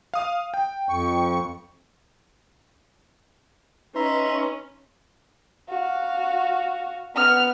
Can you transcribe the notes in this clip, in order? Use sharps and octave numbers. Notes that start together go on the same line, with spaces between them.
F5 D#6
G5
F2 C#6
C#4 D#4 B4 E5 A#5 C6
F#4 F5
B3 F6